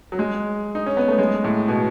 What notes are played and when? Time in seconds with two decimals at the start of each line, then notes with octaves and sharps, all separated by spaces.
0.12 F#3
0.19 G#3
0.75 D#4
0.86 C#4
0.97 B3
1.08 A3
1.19 G#3
1.44 A2
1.68 B2